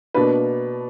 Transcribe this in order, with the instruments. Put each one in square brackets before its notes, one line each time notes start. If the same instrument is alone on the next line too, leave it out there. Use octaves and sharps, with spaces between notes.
[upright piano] B2 A#3 D4 B4